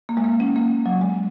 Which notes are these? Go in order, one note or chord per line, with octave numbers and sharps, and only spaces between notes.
A#3
G#3
A#3
C#4
A#3
F#3
G#3